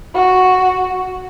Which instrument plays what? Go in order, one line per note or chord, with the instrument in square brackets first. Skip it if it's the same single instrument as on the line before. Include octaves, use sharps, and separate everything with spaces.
[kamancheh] F#4